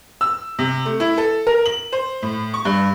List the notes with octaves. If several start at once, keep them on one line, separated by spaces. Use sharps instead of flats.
E6
C3
A3
E4
A4
A#4
F#7
C5
A2
C#6
G2